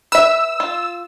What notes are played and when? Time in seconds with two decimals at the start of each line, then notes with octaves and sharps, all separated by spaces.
0.12 B4 E5 E6
0.60 F4